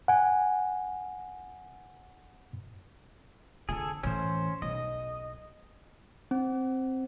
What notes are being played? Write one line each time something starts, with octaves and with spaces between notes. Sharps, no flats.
F#5 G#5
F2 D3 G#4 A4
A2 E3 C#4 C5
B1 D#5
C4